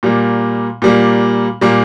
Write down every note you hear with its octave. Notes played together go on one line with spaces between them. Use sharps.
A#2 G3 A#3
A#2 G3 A#3
A#2 G3 A#3